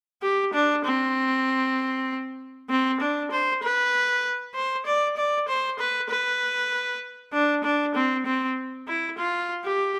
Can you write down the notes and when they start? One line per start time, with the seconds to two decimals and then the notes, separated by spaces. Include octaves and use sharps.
0.22 G4
0.53 D4
0.85 C4
2.70 C4
3.01 D4
3.31 C5
3.63 B4
4.54 C5
4.86 D5
5.17 D5
5.48 C5
5.79 B4
6.09 B4
7.33 D4
7.64 D4
7.95 C4
8.26 C4
8.88 E4
9.18 F4
9.64 G4